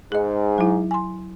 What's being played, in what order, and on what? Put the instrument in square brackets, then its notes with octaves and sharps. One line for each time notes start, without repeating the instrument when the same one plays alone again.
[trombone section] G#2 [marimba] G#4 D#5
[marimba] F#3 E4
G#5 C6